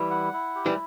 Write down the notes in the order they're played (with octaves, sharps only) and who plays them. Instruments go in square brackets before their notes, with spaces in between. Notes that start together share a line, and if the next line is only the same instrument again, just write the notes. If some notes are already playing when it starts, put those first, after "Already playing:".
Already playing: [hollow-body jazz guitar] E3 G3 [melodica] E4
[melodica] F#5
E4
G4
[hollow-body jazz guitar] E3 G3